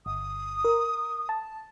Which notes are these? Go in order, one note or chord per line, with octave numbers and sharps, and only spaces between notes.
G1 D#6
A#4
A5